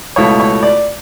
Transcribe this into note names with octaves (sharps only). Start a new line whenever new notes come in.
C#2 B2 A3 E4 C#5
C#5
D5